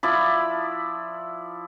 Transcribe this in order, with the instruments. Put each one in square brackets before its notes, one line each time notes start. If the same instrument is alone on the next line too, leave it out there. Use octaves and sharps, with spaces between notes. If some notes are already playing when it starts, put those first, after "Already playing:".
[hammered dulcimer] F3 E4 D5 B5